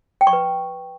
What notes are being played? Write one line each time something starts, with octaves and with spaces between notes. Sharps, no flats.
G5
C#6
B4